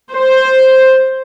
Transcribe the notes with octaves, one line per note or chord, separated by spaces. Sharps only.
C5